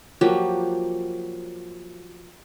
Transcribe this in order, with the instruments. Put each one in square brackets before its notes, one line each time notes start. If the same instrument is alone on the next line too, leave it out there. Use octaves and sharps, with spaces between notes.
[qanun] F3 F#3 A#3 G4